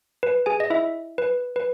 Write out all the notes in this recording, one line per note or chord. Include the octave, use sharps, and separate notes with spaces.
B4
G#4 G#5
D#5
E4 E5
B4
B4